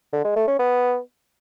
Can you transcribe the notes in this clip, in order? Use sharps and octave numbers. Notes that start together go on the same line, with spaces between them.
D3
G#3
A3
C#4
B3